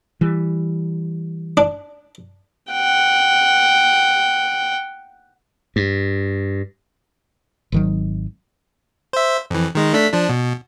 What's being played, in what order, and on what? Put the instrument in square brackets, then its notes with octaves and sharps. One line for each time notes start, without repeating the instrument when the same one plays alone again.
[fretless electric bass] E3 G3
[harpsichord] D4
[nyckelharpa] F#5 G5
[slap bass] G2
[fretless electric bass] G#1 D#3 F#3
[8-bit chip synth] C5 E5
F2 E3
D#3 G#3 D#4
A3 D4 B6
F3 D4
B2